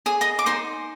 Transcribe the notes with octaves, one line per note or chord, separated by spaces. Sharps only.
G#4 D#6
D#5 D#6
D6
D#4 C5 C6